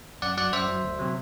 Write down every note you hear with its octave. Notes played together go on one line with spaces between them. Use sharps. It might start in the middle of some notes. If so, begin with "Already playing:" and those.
F#2 D5 F#5
F#3 D5 F#5
F#2 C5 E5
F#3
D2
C3 F#3